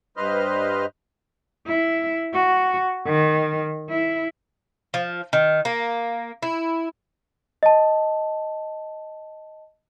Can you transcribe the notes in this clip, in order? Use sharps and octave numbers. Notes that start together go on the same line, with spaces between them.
G2 B4 C5 D#5 F6
E4
F#4
D#3
E4
F3
D#3
A#3
E4
D#5 A5